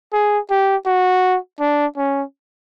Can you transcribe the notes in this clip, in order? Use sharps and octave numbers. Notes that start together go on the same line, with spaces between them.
G#4
G4
F#4
D4
C#4